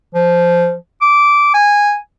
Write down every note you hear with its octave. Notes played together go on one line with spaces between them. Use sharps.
F3
D6
G#5